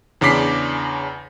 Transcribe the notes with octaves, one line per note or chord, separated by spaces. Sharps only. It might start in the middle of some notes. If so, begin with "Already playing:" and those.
E2 C#3 D4 D6 B6 C7